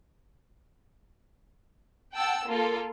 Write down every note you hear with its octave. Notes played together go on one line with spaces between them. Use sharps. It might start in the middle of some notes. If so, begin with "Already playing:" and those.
F#5 G5 A5 E6
A#3 F4 A4